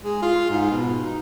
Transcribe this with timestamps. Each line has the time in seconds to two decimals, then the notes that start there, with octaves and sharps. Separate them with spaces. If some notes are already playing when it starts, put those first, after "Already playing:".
0.02 G#3
0.22 F4
0.50 G#2
0.71 B2
1.05 D#4